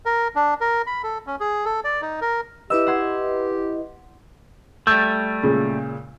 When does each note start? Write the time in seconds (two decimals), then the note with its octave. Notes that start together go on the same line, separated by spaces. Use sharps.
0.05 A#4
0.35 D4
0.61 A#4
0.87 B5
1.03 A4
1.27 C#4
1.40 G#4
1.65 A4
1.84 D5
2.02 D#4
2.21 A#4
2.70 E4 G4 B4 D#5 E6
2.87 F#5 C6 G#6
4.87 G3 A3 E6 G6
5.43 A#2 C#3 G#3